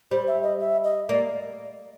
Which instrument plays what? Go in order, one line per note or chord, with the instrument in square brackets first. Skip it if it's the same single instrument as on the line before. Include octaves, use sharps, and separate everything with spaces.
[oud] G3 [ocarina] C5
[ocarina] E5
D#5
E5
D#5
[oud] A#3 [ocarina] D5